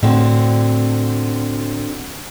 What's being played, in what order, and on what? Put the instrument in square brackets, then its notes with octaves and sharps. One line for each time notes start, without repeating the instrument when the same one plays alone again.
[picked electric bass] A2 [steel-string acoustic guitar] D3 C4 F#4